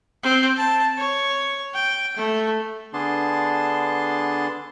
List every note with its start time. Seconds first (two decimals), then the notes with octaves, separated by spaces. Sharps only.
0.23 C4
0.57 A5
0.97 C#5
1.74 G5
2.16 A3
2.94 D3 B3 D4 G#4 A5 C6